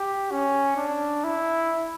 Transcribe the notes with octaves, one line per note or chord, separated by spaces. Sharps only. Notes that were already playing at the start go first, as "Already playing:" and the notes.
Already playing: G4
C#4
D4
E4